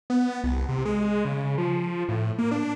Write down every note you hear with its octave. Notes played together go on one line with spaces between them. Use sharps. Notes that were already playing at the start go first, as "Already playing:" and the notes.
B3
C2
C3
G#3
C#3
F3
A2
A#3
D4